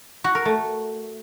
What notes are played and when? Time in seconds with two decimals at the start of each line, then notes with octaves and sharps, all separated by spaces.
0.24 F#4
0.35 A#4
0.45 A3